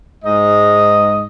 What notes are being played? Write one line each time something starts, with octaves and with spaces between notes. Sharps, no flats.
G#2 D#5